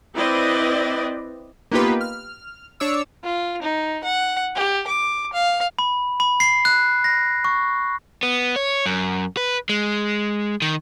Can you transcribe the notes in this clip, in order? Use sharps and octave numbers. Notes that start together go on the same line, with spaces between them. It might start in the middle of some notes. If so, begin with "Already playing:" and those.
C4 E4 B4 D5 D#5
A#3 B3 D#4 F4 G4 B4
F6
D4 C#5 D6 E6
F4
D#4
F#5
G4
D6
F5
B5
B5
C7
F#6
A#6
C#6
B3
C#5
F#2
B4
G#3
D#3